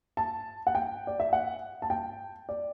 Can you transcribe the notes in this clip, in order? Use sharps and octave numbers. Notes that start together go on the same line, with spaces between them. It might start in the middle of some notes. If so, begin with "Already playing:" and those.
A5
F#5
G5
D5
E5
F#5
A5
G5
D5